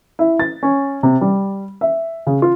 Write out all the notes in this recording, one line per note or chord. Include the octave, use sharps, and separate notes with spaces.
E4
A6
C#4
C3
G3
E5
C#3
F4